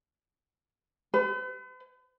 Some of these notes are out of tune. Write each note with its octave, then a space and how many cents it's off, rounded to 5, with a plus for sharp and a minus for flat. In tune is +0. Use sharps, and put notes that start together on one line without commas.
B4 +45